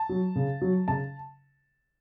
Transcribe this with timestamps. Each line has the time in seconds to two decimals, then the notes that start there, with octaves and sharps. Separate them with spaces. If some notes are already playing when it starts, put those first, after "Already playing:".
Already playing: A5
0.09 F#3
0.36 C#3
0.61 F#3
0.88 C#3 A5